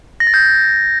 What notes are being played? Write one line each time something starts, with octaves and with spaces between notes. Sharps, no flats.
A#6
A6
G6